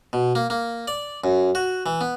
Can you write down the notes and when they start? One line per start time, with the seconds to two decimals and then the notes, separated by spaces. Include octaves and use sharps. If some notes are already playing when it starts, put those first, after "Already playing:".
0.13 B2
0.35 A#3
0.50 A#3
0.88 D5
1.24 F#2
1.55 F#4
1.86 E3
2.01 B3